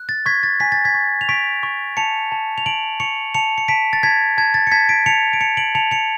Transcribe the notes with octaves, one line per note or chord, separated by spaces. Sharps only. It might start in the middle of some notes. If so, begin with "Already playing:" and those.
Already playing: F#6
A6
C#6 G#6 B6
A6
G#5 B6
A6
G#6 B6
C#6
F7
C#6 B6 D7
C#6
A5 C#7 F7
A5
F7
A5 D7 F#7
C#6 C#7 F7
A5 C#7 F7
C#7
A5 B6 D7
A6
A5 G#6 B6
A5 G#6
A6
C#7
A5 G#6 B6
B6 D7
A5 C#7 F7
D7
A5 C#7 F7
D7 F#7
A5 C#7 F7
C#7 F7